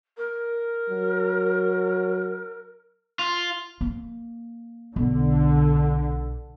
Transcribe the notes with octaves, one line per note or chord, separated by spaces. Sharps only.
A#4
F#3
F4
A#3
B1 D3